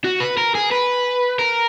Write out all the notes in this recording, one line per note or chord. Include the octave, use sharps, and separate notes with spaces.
F#4
B4
A#4
G#4
B4
A#4